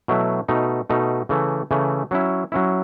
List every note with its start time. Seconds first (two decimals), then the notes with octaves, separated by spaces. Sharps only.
0.08 B2 F#3 A3 E4
0.48 B2 A3 D#4
0.90 B2 A3 D#4
1.29 C#3 E3 A3
1.71 C#3 E3 A3
2.11 F#3 C#4 E4
2.52 F#3 C#4 E4